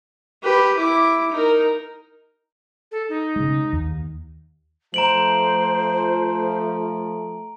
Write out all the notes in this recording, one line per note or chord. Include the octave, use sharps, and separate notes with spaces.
G4 B4
E4 D6
D#4 A#4
A4
D#4
C#3 G#3
D#2
F3 A3 C5 A#5 D7 F#7